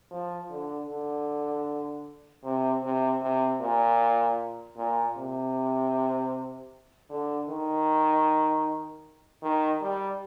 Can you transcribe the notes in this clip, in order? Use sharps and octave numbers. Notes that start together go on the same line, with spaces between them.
F3
D3
D3
C3
C3
C3
A#2
A#2
C3
D3
D#3
D#3
G3